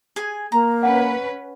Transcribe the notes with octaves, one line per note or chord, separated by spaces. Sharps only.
G#4 G#5
A#3 A#5
C#4 B4 F#5 G#5